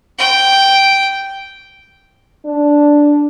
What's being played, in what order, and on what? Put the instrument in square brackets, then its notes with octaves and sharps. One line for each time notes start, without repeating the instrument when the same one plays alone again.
[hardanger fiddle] G5
[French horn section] D4